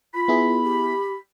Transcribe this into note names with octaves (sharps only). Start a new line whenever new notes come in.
F4 B5
B3 E4 G#4
G4